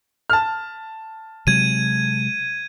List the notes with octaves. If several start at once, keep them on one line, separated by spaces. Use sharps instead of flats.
A5 F6
C3 F#3 G#3 G#6 D#7